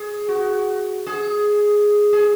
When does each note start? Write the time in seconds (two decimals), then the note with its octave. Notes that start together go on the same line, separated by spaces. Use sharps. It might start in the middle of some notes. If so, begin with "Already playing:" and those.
Already playing: G#4
0.29 F#4
1.07 G#4
2.13 G#4